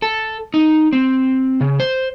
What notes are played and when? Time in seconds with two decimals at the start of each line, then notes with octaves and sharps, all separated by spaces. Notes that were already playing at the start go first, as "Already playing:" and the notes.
0.02 A4
0.54 D#4
0.93 C4
1.61 C#3
1.80 C5